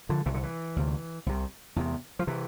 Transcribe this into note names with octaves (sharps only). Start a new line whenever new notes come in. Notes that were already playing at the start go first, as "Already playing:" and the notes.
D3 F3
C2 C3 E3
D3
E3
D2 C3
C2 C3
E2 C3
F3
C3 E3